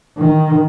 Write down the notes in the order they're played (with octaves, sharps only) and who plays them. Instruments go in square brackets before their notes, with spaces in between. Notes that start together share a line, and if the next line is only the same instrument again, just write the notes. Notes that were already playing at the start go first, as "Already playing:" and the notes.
[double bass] D#3